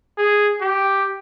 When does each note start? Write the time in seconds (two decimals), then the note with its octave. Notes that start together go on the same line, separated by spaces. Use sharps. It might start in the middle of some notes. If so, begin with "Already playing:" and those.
0.18 G#4
0.61 G4